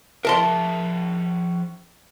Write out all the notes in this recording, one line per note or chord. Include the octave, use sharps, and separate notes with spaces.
F3 G#4 A#4 E5 A5 C6